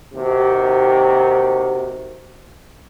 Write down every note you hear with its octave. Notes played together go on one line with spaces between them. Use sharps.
D#2 C3 D#3 F#4